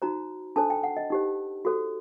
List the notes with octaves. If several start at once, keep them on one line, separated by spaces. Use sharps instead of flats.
D#4 F#4 C5 A#5
D4 A4 C5 A5
G5
F#5
D#5
D#4 G4 C5
F#4 A4 C5